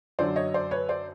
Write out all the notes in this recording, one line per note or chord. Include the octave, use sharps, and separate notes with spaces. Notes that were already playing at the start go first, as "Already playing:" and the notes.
F#2 D3 F#3 C5 D5
C#5 D#5
C5 D5
B4 C#5
C5 D5